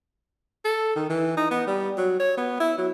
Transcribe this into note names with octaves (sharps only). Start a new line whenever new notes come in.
A4
D#3
E3
D#4
B3
G3
F#3
C#5
B3
E4
F#3